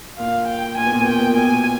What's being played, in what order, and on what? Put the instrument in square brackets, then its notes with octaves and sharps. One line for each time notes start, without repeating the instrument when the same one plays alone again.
[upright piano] A#2 [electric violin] F5
[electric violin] G5
[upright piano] A#2 [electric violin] G#5
[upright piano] B2
A#2
B2
[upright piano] A#2 [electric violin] G5
[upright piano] B2
A#2
[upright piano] B2 [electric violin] G#5
[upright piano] A#2